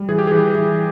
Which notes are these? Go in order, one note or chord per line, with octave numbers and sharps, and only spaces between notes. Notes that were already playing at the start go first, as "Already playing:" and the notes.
Already playing: G3
E3 G#4
G4
E3 G#4
E3